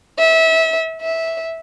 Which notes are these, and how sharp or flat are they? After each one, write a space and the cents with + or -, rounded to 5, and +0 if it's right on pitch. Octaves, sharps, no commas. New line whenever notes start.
E5 -25
E5 -10